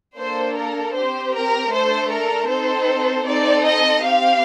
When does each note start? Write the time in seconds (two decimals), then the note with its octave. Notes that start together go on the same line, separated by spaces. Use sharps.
0.17 A#3 D4 A4 C5
0.56 A#4
0.94 C4 G4 C5
1.33 A#4
1.71 A3 D4 A4 C5
2.10 A#4
2.49 C4 D#4 A4 C5
3.26 C4 D#4 A4 D5
3.64 D#5
4.03 C4 G4 F5